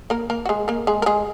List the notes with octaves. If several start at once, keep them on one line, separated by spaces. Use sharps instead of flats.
A#3 A#4
A#3 A#4
F#4
G#3 G#4
A#3 A#4
G#3 G#4
A#4
G#3 G#4